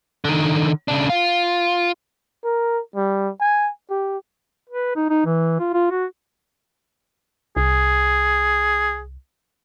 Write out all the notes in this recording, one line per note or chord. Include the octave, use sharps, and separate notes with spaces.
D3 D#3
C#3 D4
F4
A#4
G3
G#5
G4
B4
D#4
D#4
E3
F4
F4
F#4
C2 G#4